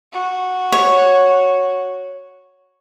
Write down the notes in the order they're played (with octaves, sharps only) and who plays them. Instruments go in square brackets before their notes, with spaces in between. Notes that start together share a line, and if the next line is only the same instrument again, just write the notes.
[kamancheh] F#4
[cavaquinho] C#5